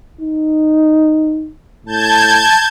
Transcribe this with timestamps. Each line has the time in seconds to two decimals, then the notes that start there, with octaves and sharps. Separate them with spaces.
0.21 D#4
1.86 A2 A5 G6 G#6